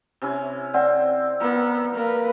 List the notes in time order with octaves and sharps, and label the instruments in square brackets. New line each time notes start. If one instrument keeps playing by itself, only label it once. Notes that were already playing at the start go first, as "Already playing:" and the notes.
[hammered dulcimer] C3 C#4 E4
[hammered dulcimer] C4 [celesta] D5 F#5 G#5
[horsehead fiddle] B3 [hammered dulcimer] A#4
[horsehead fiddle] A#3 B4